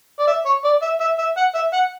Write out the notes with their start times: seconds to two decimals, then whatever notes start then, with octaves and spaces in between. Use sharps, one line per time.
0.20 D5
0.28 E5
0.46 C#5
0.65 D5
0.82 E5
1.01 E5
1.19 E5
1.37 F#5
1.55 E5
1.73 F#5